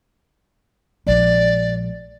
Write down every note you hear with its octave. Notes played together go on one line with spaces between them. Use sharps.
A#1 G#3 D5